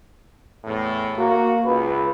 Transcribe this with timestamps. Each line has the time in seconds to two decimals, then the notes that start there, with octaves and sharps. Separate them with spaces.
0.65 E2 A2
1.18 A#3 F#4
1.65 C#2 B4